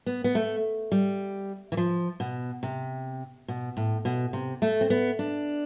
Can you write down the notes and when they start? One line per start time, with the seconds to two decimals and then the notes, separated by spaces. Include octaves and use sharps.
0.06 B3
0.24 B3
0.35 A3
0.92 G3
1.72 E3
1.77 F3
2.20 B2
2.63 C3
3.48 B2
3.77 A2
4.05 B2
4.33 C3
4.62 A3
4.81 C4
4.90 B3
5.19 D4